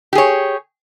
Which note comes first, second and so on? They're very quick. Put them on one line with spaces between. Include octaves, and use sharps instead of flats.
G4 G#4 C#5